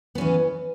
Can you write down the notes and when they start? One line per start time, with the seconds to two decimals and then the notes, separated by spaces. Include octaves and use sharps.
0.15 B3
0.18 C#4
0.21 E3